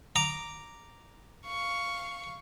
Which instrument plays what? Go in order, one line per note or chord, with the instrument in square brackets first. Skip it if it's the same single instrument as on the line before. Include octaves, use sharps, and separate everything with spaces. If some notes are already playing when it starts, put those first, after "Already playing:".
[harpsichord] A#5 D6
[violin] F5 C#6